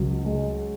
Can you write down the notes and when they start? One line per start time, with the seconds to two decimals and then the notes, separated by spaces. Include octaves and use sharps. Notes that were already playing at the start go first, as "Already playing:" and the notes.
Already playing: C#2 F#3
0.25 G#3